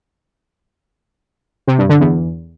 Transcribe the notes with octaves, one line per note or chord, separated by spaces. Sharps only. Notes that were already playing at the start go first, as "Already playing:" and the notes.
C3
G2
D3
E2